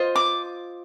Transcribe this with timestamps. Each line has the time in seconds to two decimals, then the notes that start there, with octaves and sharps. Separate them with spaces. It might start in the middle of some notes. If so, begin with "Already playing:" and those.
Already playing: F4 C5 D#5
0.16 D6